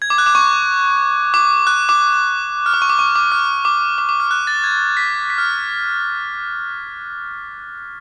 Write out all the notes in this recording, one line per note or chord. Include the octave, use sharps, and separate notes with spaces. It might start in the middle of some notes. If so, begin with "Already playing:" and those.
G#6
D6
F#6
D6
C#6
D6
F#6
D6
F6
D6
C#6
D6
C#6
D6
F6
D6
D6
D6
F6
F#6
A6
G#6
B6
B6
F6